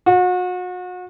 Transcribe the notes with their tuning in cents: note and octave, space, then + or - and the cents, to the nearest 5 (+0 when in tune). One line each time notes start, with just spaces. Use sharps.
F#4 -35